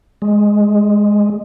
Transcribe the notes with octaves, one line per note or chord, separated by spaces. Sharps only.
G#3